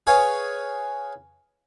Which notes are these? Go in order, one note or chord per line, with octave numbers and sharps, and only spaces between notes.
G#4 B4 C#5 F5 G#5